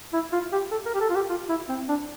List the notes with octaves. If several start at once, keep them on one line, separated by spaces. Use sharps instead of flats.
E4
F4
G4
A4
A#4
G4
A4
F4
G4
F4
E4
C4
D4